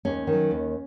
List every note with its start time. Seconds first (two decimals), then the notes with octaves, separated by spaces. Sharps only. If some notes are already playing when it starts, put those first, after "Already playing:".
0.05 D#2 C#4
0.27 D#3
0.32 F#3
0.51 D#2